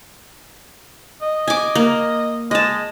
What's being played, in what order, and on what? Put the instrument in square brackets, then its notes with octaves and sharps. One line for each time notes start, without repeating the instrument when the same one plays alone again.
[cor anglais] D#5
[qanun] G#5 D6
A#3
[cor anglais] G#3 [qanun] D#5 A5